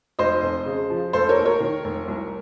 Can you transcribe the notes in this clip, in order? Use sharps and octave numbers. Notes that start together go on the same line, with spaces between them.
F1 C5 D#5
F2
C#3
F3
F1 A4 C5
A#4 C#5
D#2
A#4 C#5
D#3
F1
C2